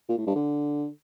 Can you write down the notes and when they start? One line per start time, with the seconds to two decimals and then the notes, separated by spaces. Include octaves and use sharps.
0.09 A#2
0.18 A2
0.27 G2
0.35 D3